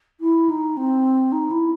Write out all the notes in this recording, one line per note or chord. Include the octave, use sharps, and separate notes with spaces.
E4
D#4
C4
D#4
E4